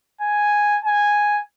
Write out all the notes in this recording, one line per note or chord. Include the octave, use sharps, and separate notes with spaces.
G#5
G#5